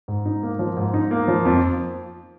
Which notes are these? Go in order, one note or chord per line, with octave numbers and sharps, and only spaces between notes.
G#2
D#4
A#3
F3
G#2
D#4
A#3
F3
F2